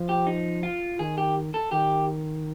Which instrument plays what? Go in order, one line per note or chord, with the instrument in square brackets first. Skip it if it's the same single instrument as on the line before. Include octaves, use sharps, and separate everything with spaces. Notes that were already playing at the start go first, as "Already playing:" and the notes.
Already playing: [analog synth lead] F3
[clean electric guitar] G4
D#4
F4
[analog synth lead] D#3 [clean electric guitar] G#4
[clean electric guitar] G4
A4
[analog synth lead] D#3 [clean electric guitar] G4